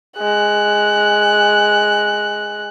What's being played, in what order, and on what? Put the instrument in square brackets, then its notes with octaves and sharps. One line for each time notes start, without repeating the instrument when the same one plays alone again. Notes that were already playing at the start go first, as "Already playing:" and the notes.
[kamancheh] G#3 F#6